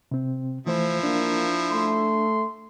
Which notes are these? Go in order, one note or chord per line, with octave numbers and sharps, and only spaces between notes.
C3 C4
E3 F3 A3 E4 C5
A#3 D4
A3 C6